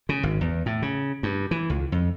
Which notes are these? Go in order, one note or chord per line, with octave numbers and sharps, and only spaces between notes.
C#3
G#1
E2
A2
C#3
G2
E3
C#2
F2